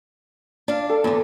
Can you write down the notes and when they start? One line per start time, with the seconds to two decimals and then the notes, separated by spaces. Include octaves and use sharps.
0.68 D4 F5
0.89 A4
1.04 E2 D3